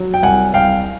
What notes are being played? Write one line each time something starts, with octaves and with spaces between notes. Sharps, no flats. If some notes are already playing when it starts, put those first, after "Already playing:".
Already playing: F#3
G5
C2 F#5 G#5
C2 F5 G5